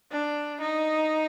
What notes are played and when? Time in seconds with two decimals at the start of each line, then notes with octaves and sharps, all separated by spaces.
0.12 D4
0.61 D#4